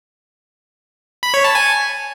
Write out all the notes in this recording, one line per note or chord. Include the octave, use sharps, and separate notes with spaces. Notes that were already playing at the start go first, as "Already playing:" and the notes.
B5
C#5
A5
G#5